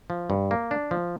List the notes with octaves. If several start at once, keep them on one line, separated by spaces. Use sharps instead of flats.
F3
G2
A#3
D4
F3